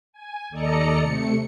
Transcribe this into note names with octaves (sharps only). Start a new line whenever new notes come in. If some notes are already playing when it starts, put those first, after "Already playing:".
G#5
D#2 A4 D5 D#5 A#5 C#7
C3 A3 C#7